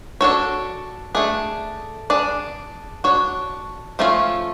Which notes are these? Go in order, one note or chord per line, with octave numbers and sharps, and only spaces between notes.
D4 F#4 A4 C#5
A3 D4 G#4
D4 G#4 D5
D4 F#4 C#5
F3 A3 C#4 F4